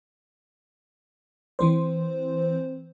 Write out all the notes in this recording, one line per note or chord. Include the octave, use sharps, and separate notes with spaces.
E3 C4 C5